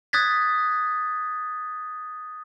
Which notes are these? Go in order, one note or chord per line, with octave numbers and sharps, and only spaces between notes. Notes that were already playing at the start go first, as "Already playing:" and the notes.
D#6 F#6 G#6 A6 B6